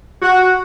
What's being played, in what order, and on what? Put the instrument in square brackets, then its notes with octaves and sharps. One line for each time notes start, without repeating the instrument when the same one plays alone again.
[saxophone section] F#4